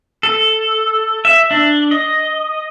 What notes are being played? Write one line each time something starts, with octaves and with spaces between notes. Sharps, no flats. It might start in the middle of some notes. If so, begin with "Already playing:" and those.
A4
E5
D4
D#5